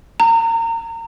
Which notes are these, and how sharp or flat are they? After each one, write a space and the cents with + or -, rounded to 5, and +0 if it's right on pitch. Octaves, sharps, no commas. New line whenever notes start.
A#5 -30